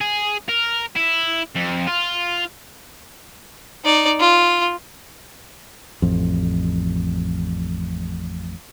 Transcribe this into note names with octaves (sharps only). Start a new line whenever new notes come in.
G#4
A#4
E4
F2
F4
D#4 D5
F4
A1 F2